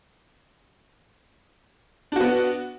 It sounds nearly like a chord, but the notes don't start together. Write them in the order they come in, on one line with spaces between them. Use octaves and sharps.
D4 F#4 B3